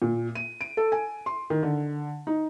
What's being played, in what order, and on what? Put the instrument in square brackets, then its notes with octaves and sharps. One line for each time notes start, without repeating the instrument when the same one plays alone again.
[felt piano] A#2
D#7
D7
A4
G#5
C6
D#3
D3
D#4